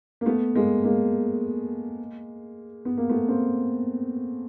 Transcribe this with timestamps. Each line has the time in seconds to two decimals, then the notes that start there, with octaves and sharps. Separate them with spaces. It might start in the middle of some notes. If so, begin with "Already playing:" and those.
0.21 A#3
0.26 A3 B3
0.56 G#3 A#3
0.84 G#3 A#3
2.85 B3
2.98 A#3
3.10 A3 B3
3.28 A#3 C4